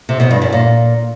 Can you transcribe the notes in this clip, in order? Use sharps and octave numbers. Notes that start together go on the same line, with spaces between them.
C3
B2
G2
F#2
A#2